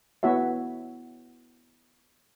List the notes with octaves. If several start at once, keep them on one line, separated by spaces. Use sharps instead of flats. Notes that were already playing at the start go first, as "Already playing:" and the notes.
B3 E4 F#4 C#5 E5